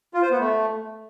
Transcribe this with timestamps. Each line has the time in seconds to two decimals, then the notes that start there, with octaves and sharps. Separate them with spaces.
0.14 F4
0.22 C5
0.31 B3
0.39 A3